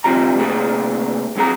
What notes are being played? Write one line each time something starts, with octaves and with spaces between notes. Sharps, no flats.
D2 C3 F3 G3 A#5
C3 A3 A#3 G#4 A#4
C2 F#3 C4 G#4 A#5